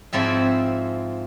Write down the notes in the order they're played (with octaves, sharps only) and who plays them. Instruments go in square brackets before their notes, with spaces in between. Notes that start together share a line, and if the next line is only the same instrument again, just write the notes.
[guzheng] G#2 F3 C4 E4 C#5